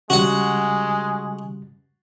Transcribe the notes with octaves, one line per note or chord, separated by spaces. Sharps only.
C#3 G3 G#3 F#4 F#5